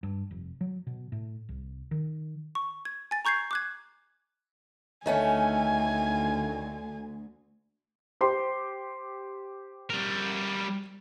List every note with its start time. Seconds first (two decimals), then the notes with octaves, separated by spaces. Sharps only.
0.03 G2
0.31 F1
0.61 F#3
0.87 B2
1.12 A2
1.49 C2
1.91 D#3
2.55 C#6
2.85 G#6
3.11 G#5 A6
3.25 A#5 C#6 G6 G#6 C7
3.51 D6 F#6 G#6
5.06 D2 D#3 A3 C#4 G#5
8.21 G4 C5 C6
9.90 G3 A#4